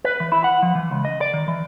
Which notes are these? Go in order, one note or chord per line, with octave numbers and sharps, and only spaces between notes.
B4
E3
E4
F#5
F3
E3
C#2
D#5
D5
D#3
E3